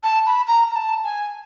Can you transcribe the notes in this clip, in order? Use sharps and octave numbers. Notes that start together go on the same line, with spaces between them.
A5
B5
A#5
A#5
A5
G#5